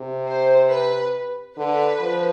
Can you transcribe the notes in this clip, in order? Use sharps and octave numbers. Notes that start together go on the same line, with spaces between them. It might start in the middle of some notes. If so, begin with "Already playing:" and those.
Already playing: C3
C5
B4
D3 B4
F3